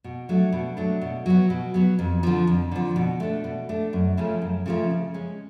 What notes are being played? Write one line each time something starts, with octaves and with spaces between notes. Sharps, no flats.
B2
F#3 A3 D4
B2
F#3 A3 D4
B2
F#3 B3
B2
F#3 B3
F2
D3 F3
F2
D3 F3
B2
A3 D4
B2
A3 D4
F#2
C#3 F3 A3 C#4
F#2
C#3 F3 A3 C#4
C#3
G#3 C#4